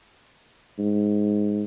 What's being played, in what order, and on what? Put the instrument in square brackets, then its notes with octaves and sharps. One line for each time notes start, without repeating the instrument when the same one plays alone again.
[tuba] G#2